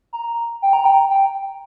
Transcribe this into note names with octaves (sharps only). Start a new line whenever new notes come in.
A#5
G5
A#5
G5
G5